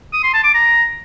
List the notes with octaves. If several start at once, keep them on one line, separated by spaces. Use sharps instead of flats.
D#6
C6
A5
D6
A#5